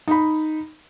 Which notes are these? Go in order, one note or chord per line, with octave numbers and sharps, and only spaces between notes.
D#4 B5